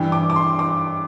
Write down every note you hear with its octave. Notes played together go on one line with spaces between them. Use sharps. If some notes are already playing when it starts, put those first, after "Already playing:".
Already playing: G2 E3 G5
D6
D6
C6
D6